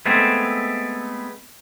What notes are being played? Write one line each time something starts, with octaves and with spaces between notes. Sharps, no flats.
G#3 A3 B3 C4